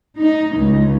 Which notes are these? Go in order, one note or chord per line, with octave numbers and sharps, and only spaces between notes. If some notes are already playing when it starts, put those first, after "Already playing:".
D#4
C#2